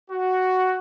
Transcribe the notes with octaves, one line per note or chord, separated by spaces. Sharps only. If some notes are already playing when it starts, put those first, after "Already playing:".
F#4